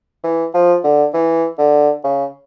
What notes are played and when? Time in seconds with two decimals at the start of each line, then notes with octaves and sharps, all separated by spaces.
0.24 E3
0.54 F3
0.84 D3
1.14 E3
1.58 D3
2.04 C#3